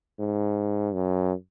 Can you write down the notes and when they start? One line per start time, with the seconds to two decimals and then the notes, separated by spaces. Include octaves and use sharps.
0.20 G#2
0.94 F#2